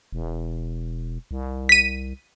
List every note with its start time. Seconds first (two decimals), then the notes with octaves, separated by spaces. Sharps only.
0.13 E1
1.31 C2
1.69 B6 D#7